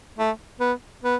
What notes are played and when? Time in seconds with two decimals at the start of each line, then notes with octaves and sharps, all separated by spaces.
0.18 A3
0.60 B3
1.03 B3